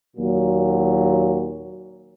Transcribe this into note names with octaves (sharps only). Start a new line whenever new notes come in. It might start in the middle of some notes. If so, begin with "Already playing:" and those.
D#2 A#2 F#3